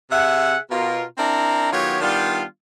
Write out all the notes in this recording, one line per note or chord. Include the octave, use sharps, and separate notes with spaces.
C3 G#4 E5 F#5
B2 F4 A#4
C4 D4 E4 A#4 A#5
D#3 F#3 B3 F4 G4 C#5
D#3 G3 B3 D4 F4